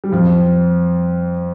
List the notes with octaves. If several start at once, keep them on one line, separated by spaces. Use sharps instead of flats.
G3
F2 F3